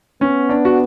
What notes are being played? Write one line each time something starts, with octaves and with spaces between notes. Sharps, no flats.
B3 C#4
D4
F#4